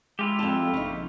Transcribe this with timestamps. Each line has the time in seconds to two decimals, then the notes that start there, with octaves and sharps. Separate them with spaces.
0.19 G#3 E4 F4 G4
0.39 F2 A5
0.74 A#1 C#3 D#4